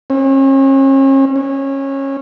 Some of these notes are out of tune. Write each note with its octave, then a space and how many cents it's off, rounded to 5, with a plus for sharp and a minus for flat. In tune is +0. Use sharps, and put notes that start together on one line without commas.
C#4 -40
C#4 -20